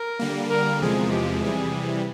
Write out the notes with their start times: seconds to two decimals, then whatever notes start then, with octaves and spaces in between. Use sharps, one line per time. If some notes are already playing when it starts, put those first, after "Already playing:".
Already playing: A#4
0.19 D3 G3 A#3
0.50 A#4
0.81 E2 C3 F3 G#3 G#4
1.11 G4
1.42 C3 E3 G3 G#4